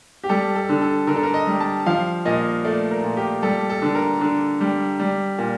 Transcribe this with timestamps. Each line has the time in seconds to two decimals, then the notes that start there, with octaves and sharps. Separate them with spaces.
0.24 G4
0.29 G3 A4
0.55 A4
0.69 D3
0.81 A4
1.07 D3 A#4
1.16 A4
1.23 A#4
1.34 D#5
1.47 G3
1.60 A5
1.86 F3 F5
2.25 A#2 D#5
2.64 A3 D5
2.91 A#4
3.04 A#2
3.17 G4
3.42 G3 A4
3.69 A4
3.82 D3
3.95 A#4
4.21 D3
4.61 G3
5.00 G3
5.38 A#2